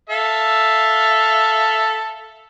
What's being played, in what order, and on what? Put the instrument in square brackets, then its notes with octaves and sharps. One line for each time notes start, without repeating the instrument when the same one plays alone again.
[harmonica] A4 E5 F5